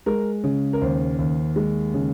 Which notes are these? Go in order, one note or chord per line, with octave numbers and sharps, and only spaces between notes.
G#3 A#4
C#3
A#4
D#2 C5
D#2
G#3
C#3